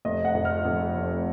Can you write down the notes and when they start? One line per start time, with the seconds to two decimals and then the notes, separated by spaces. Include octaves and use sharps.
0.05 F1 D#5
0.25 F#5
0.35 F2
0.45 F6
0.65 F2
0.95 F1